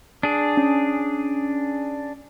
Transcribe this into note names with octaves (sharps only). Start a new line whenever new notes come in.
D4 G#4
C#4